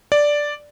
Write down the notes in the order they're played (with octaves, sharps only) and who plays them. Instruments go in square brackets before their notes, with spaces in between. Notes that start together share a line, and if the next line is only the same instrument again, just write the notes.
[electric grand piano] D5